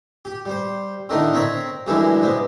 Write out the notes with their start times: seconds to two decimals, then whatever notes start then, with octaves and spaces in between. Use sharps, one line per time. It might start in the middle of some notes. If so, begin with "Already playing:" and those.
0.25 G4
0.46 G3 C5
1.09 A2 D3 D#3 A3 D4 D#4
1.33 C4 A#4 C#5 B5
1.87 F#2 D3 E3 G3 G#3 E4
2.21 C3 G#3 B3